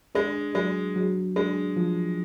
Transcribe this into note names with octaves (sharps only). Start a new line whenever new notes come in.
G#3 D4
F#3 G#3
F#3
G#3 D4
F3